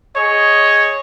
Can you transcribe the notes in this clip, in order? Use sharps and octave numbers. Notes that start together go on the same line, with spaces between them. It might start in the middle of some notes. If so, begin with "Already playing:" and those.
G#4 C#5 D#5